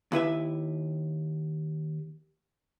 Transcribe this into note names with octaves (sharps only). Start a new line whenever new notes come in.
D#2 E4 B4 E5